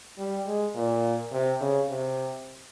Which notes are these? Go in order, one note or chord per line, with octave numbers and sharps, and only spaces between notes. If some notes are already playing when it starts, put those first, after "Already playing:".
G3
G#3
A#2
C3
C#3
C3